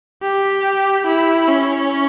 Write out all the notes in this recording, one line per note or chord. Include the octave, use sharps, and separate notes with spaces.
G4
E4
C#4